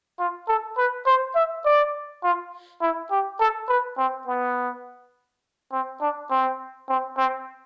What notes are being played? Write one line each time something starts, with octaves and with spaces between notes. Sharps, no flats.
F4
A4
B4
C5
E5
D5
F4
E4
G4
A4
B4
C4
B3
C4
D4
C4
C4
C4